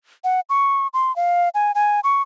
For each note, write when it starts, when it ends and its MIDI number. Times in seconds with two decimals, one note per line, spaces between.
0.24 0.40 78
0.49 0.87 85
0.94 1.14 84
1.16 1.49 77
1.54 1.72 80
1.75 2.00 80
2.04 2.22 85